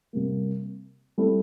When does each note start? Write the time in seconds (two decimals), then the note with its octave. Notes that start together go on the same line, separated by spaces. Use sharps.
0.13 C3 G3 A#3
1.18 G3 C4 E4 A4